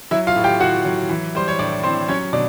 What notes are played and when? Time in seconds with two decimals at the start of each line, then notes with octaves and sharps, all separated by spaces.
0.11 F#3 E4 E5
0.27 F4 F5
0.36 A2
0.44 G4 G5
0.60 A2 F#4 F#5
0.85 F#3
1.09 E3
1.35 G3 C5
1.48 C#5
1.59 A2 D4 D5
1.83 A2 C4 C5
2.08 F#3 C#4 C#5
2.33 B2 D4 D5